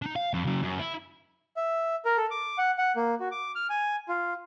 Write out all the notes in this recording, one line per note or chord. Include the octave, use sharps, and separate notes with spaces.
D4 D#4
F5
F2
C#3 F#3
F#2
E4
E5
A#4
A4
D6
F#5
F#5
A#3
F#4
D6
F6
G#5
F4